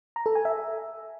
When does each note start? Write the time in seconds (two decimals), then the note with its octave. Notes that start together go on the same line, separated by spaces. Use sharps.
0.16 A#5
0.26 A4
0.35 G#5
0.45 E5